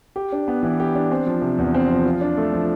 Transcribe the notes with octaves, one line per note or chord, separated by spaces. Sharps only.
G4
D4
B3
E3
G4
D4
C4
F3
C3
E2
C4
F3
F4
D4
A3
F3